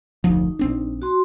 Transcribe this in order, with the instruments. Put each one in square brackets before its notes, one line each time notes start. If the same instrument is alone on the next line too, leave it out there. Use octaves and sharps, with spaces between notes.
[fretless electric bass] F1 D2 F3 [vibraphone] D#4
[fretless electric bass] A#1 C4 D4
[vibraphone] F#4 C6